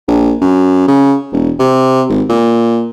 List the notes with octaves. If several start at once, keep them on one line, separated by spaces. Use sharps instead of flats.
A#1
F#2
C#3
E1
C3
G#1
A#2